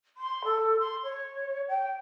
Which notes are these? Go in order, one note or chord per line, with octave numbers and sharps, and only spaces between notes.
C6
A4
C6
C#5
G5